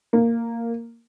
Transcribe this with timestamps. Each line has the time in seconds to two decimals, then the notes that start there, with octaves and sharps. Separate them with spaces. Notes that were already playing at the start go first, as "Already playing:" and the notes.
0.13 A#3